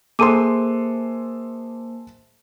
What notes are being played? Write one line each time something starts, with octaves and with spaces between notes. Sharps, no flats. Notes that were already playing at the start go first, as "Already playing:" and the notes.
A#3 G#4 A4 C5 C6 D6 D#7